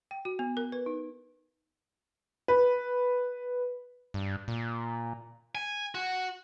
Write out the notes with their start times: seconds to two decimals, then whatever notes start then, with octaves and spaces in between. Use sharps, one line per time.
0.11 G5
0.25 F#4
0.39 B3
0.57 A#4
0.72 B4
0.86 D#4
2.48 B4
4.14 G2
4.48 A#2
5.55 G#5
5.95 F#4